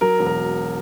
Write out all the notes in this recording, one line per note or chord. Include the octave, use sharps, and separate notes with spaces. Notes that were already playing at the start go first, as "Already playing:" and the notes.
F#3 A#4
E1
A#4